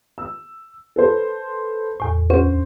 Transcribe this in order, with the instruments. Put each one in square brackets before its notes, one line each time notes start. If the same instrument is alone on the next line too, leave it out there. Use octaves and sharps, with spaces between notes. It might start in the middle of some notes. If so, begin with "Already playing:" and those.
[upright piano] E6
A4 B4 C5
[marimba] E2 A2
[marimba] D2 C#4 C#6 [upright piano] C5